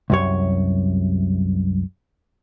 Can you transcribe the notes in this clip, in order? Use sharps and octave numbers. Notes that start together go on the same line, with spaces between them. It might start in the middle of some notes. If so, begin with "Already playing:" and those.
C2 F#2 C#5